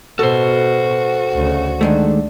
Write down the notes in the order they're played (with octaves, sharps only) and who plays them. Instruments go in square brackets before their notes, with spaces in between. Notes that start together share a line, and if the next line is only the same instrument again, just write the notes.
[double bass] B2 [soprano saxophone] F#4 [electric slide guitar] A4 C5
[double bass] D2 C#3
[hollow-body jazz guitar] D#3 G#3 A3 [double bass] D4